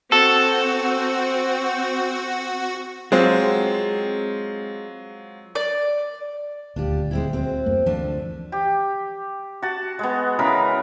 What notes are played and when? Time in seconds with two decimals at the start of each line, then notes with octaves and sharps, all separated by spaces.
0.12 C4 F#4 A4
3.12 F#3 G#3 C4 F4 C5
5.55 D5
6.76 D#1 D2 D4 F4 G4
7.11 G#3 C4 E4
7.33 C4 F#4 C5
7.66 F#2 A3 A#3
7.86 D2 E3 F3 A3 D4
8.52 G4
9.62 F#4 A5
9.99 G#3 B3
10.39 C#3 E3 A#4 B5